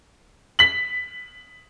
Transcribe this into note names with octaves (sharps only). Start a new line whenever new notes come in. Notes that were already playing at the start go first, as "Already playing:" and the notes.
B6 F#7